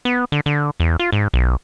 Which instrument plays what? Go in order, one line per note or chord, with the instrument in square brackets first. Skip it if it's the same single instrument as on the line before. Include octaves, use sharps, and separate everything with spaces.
[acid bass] B3
D3
D3
E2
F4
G#2
B1